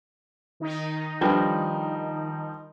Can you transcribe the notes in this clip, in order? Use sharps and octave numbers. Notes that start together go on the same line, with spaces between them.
D#3 D#4
F3 G3 D4 A4 B4